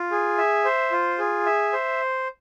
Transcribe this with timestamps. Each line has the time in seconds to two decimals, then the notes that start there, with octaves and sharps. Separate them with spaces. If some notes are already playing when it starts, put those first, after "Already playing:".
Already playing: F4
0.11 G#4
0.38 E5
0.65 C5
0.91 F4
1.19 G#4
1.46 E5
1.73 C5